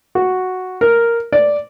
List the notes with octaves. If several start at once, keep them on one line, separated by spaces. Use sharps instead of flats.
F#4
A#4
D5